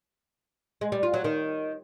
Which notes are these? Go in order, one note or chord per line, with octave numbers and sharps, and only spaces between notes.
G#3
G3
F4
F#3
D#3